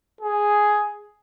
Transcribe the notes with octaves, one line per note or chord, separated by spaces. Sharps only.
G#4